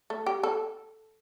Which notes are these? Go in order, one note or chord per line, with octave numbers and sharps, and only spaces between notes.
A3
G4
A4